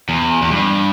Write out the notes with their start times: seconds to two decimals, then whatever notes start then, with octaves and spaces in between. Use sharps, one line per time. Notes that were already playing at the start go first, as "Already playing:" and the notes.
0.09 E2
0.42 E2
0.51 G2